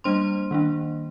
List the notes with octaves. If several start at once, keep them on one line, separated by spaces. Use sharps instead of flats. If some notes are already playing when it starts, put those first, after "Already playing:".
G3 A#3 D4 C5 C6
D#3 A#3 D4